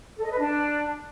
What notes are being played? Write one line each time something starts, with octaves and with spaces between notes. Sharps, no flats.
A4
D#5
B4
D4